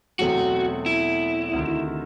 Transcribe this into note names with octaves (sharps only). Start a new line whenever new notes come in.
E2 B2 F#3 A3 C4 F#4
E4
D2 C3 D#3